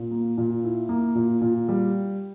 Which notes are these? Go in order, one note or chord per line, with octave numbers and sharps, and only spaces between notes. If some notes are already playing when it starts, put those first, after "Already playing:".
Already playing: A#2
A#3
A#2
E4
A#3
A#2
A#2
G3